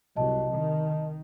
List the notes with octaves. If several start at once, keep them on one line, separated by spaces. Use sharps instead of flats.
C2 F#3 D#5 A5
D#3